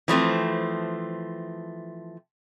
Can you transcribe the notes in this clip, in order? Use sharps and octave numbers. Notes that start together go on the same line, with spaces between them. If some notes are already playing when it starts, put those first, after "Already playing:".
E3 F3 A3 C4